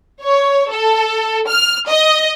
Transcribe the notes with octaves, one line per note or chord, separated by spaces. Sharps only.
C#5
A4
F6
D#5